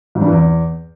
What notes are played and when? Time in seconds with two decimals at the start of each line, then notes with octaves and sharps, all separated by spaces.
0.15 G#2
0.21 G2
0.27 E3
0.32 E2